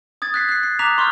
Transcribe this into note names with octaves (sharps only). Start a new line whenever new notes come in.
D#6 G#6 A6
F#6 B6 C7
F#6 C7
C7
A#5 D6 D#6 F#6 B6 F7
C6 C#6 D#6 F6 G6